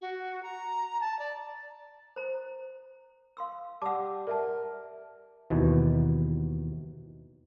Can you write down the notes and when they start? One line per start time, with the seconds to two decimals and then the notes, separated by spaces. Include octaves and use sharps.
0.01 F#4
0.43 A#5
1.01 A5
1.19 D5
2.16 C5 A#5
3.37 F5 C6 E6
3.82 G3 F#5 A5 D6 E6
4.27 A#4 D5 E5 A5
5.50 D#2 B2 E3